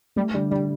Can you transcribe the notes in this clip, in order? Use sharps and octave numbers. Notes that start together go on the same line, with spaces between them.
G3 A3
D3 G3
D3 G3